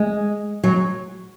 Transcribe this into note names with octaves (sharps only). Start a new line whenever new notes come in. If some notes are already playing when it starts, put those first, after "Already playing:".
Already playing: G#3
F#3